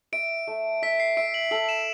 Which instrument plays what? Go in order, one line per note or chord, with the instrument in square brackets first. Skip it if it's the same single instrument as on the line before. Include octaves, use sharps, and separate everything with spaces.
[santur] E5 [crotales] D7
[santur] A3
[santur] E5 [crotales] B6
[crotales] C7
[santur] E5 [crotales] D7
[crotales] F#7
[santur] A4 [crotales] F#7
[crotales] E7